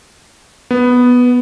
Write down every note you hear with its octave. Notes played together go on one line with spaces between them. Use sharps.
B3